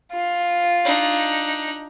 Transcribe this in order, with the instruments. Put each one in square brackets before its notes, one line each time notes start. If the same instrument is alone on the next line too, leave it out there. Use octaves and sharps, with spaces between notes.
[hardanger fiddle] F4
[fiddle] D4 D#4